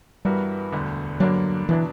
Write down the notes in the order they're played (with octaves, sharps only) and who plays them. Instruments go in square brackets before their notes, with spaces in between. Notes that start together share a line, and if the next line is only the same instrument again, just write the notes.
[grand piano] G2 E3 B3 F#4 A#4 [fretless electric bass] G3
[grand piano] E1 D2 D3
[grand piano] G2 D3 A#3 D4 [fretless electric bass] F#3
[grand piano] B2 F#3 B3 D4 [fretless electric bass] E3